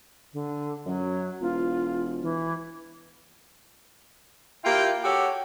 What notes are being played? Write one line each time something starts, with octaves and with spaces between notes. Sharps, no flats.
D3
F#2 F#3
E1 F4
E3
A#3 E4 F4 G4 G5
F#4 G4 A4 C#5 F#5